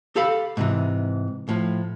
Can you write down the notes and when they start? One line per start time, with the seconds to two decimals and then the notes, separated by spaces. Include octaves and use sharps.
0.16 G4 A4 F5 B5
0.57 G#2 C3 E3
1.49 A2 F3